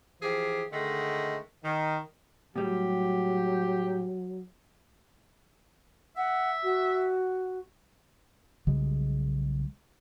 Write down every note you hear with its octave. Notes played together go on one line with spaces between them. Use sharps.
E3 F3 G4 G#4
D3 D#3 G#3 A3
D#3
A2 F#3 G3 G4
E5 F#5
F#4
B1 C#3 G3 G#3